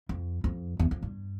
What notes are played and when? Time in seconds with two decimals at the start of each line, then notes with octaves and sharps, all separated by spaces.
0.09 F2
0.44 F2
0.79 E2
0.91 F2
1.02 G2